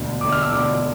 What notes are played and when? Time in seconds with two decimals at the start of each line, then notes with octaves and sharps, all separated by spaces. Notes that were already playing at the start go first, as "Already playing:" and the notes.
Already playing: E1 D2 D3
0.21 E1 D2 D3 D6
0.32 F6
0.42 E6
0.52 E1 D2 D3 D6